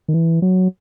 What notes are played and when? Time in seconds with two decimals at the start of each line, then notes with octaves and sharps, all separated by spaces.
0.08 D#3
0.14 E3
0.42 F#3